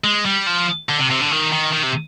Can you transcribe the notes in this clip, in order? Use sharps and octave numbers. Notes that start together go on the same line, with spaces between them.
G#3
G3
F3
D3
C3
C3
D3
D#3
D#3
D#3
C3